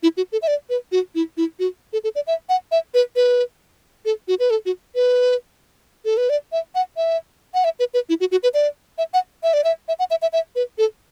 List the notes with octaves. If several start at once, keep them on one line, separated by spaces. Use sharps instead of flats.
E4
F#4
A4
E5
D5
B4
F#4
E4
E4
F#4
A4
A4
D5
E5
F#5
E5
B4
B4
A4
F#4
B4
A4
F#4
B4
A4
B4
D5
E5
F#5
E5
F#5
E5
B4
B4
E4
F#4
F#4
B4
D5
E5
F#5
E5
D5
E5
E5
F#5
E5
E5
E5
B4
A4